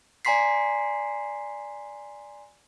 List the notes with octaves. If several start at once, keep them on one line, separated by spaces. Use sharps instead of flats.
D5 G#5 A#5 C6 B6 C7